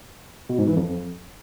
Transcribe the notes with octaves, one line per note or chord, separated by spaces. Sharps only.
B2
G#2
E3
F2